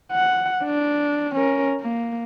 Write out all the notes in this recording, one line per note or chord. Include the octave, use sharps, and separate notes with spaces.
F#5
D4
C#4 A#4
A#3